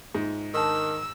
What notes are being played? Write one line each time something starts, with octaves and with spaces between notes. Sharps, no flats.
G#2 F4 E5
D#3 D4 A5 E6